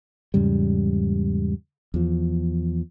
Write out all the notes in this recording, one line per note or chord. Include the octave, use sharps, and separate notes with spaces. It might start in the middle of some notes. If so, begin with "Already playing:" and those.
E2 G#2 C#3 G3
E2 F3